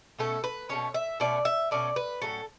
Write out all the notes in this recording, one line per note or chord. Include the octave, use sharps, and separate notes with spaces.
B2 A3 C#4 A4
B4
B2 A3 C#4 C#5
E5
B2 A3 C#4 D5
E5
B2 A3 C#4 D5
B4
A2 F#3 C#4 A4